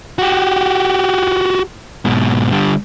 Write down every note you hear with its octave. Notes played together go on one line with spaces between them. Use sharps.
F#4 G4
G#2 B2
D3 G3